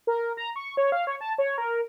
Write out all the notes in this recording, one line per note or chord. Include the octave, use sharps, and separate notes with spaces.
A#4
A#5
C#6
C#5
F5
C#5
A5
C#5
A#4